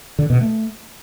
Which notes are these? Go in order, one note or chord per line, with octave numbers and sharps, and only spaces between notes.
D3
B2
A3